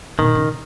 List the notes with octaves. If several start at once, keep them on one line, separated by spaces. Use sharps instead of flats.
B2 D#3
C#3